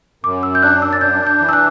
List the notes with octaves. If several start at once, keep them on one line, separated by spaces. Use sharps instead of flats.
F#2 D6
E6
G6
D4 F#6
E6
A6
D4 G6
G6
E3
E6
F#6